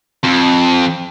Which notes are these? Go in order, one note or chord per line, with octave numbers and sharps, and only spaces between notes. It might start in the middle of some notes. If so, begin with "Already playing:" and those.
F2